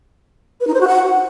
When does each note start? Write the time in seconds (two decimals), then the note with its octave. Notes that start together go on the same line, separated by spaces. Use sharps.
0.61 B4
0.67 D#4
0.74 C5
0.81 F#4
0.87 F#5